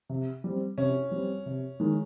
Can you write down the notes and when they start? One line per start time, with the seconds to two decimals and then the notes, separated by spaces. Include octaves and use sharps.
0.09 C3
0.44 G3 C4
0.78 C3 C#4
1.11 G3 C4
1.46 C3
1.80 D#3 G#3